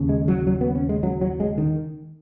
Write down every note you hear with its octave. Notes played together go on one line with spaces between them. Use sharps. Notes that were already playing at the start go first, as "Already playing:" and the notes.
Already playing: D#2 C#3
G#3
F#3
F#3
B3
C#4
G#3
F#3
F#3
G#3
D#3